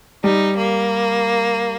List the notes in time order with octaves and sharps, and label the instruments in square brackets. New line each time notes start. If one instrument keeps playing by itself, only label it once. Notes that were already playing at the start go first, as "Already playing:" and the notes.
[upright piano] G3 [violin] D#4
[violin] A#3